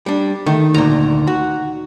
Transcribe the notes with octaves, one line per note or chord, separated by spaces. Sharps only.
G3 D4
D#3 A3
D2 A#2 A#5
F#4